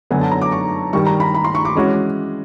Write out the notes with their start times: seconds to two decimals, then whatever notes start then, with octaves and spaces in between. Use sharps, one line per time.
0.11 F#2 D3 F#3 B3 G#5
0.21 A5
0.31 A#5
0.41 D6
0.52 C#6
0.93 G2 D#3 G3 C#6
1.06 A#5
1.20 B5
1.34 B5
1.44 C6
1.55 C#6
1.65 D6
1.75 E3 G#3 C#4 F#4